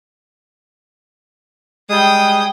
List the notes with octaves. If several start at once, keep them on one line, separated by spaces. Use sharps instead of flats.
G3 G#3 G5 D#6